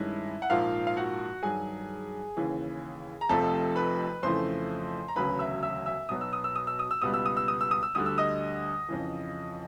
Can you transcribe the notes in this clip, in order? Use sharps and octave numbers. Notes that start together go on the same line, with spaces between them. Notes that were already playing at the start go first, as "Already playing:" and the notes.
Already playing: G2 D#3 G#3 C#4 E4
F#5
A#1 G#2 F3 A#3 F4 F5
F5
F#4 F#5
G2 D#3 F#3 G#4 G#5
D#2 C#3 E3
A#5
F1 F2 C3 F3 A3 A4 A5
B4 B5
F2 C#3 E3 A3 C5 C6
A#5
E1 D2 C#3 F#3 B4 B5
E5 E6
E5 E6
E5 E6
B1 B2 F#3 B3 D#6
E6
D#6
E6
D#6
E6
D#6
E6
C#2 B2 G3 B3 D#6
E6
D#6
E6
D#6
E6
D#6
E6
D2 D3 G3 D#6
E6
D#5 D#6
F2 C#3 E3